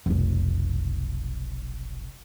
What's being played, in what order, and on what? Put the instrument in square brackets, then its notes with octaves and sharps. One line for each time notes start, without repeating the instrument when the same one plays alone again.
[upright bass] F1 B1